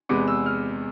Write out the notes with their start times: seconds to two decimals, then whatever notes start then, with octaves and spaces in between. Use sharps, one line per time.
0.09 E2 C3 G#3 B3 D6
0.27 E6
0.46 F6